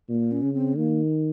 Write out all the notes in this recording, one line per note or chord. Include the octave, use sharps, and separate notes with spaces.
A#2 A#3
C#4
C#3
C4
D#3 A#3